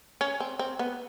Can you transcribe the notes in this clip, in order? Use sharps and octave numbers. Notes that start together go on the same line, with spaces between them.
C#4
C4
C4
B3